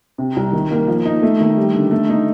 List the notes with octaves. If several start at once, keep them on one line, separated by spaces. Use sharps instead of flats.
C3
C2
D#3
A#3
F3
D#4
A3
D#3
G3
D3
A3
D#4